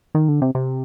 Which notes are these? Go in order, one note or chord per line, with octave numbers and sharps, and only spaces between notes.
D#3
D3
C3
C3